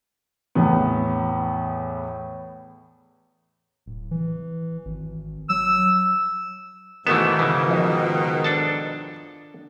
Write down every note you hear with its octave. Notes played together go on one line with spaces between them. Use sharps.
E2 A2 B3
D1
E3
G#1
F#3 E6
G#2 B2 D#3 E3 A3 B3 E7
C#3 E3
F3 D#5
D4 A4 A5